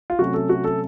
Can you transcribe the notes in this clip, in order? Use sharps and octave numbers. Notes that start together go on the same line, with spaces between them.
F4
C3 F#3 A3 C#4 F#4
A4
F#4
A4